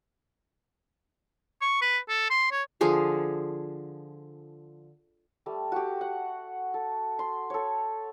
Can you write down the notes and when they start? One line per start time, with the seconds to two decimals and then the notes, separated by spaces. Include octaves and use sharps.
1.62 C#6
1.82 B4
2.09 A4
2.30 C6
2.52 C#5
2.81 D3 F3 G#4 F5
5.46 G3 A3
5.72 F#4 G4
6.01 F#5
6.74 A4
7.19 C6
7.50 A4 C#5